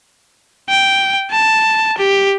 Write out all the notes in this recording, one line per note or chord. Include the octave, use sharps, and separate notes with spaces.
G5
A5
G4